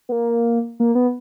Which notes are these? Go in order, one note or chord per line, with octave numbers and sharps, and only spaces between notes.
B3
A#3
A#3
B3